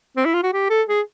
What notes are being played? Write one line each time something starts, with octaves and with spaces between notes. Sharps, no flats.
C4
E4
F4
F#4
G4
A4
G#4